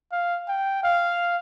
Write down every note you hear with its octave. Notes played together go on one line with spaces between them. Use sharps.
F5
G5
F5